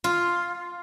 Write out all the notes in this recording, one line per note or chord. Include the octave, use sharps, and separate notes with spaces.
F4